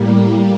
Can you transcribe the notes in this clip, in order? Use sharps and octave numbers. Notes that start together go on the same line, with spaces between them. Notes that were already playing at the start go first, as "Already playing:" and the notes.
Already playing: A2 G3 A#3